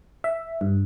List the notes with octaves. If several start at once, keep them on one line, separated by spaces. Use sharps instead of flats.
E5
G2